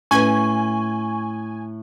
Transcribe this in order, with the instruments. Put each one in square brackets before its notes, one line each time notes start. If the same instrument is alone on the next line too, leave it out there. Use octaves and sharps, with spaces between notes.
[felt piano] A2 [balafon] C#4 B4 [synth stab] G#5 [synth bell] C#6